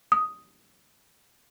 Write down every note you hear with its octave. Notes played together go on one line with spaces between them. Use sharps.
D#6